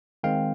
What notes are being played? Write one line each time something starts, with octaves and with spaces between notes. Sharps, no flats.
D#3 G#3 C4 F5 G5